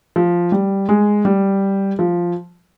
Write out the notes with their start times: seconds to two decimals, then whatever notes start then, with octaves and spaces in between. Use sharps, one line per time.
0.16 F3
0.52 G3
0.89 G#3
1.25 G3
1.99 F3